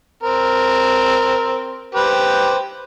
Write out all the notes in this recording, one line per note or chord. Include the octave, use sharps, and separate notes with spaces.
C4 A#4
G4 B4 C5